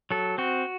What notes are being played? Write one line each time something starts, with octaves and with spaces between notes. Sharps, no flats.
F#3 A4
C4 F#4